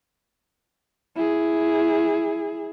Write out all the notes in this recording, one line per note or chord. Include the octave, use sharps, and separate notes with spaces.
E4 G#4